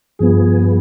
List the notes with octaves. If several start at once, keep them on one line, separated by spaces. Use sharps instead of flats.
G2 F3 B3 G#4